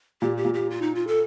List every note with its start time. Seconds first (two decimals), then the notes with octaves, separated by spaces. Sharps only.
0.22 A#2 G4
0.37 G4
0.45 A#2
0.54 G4
0.70 F4
0.82 D#4
0.95 F4
1.07 A4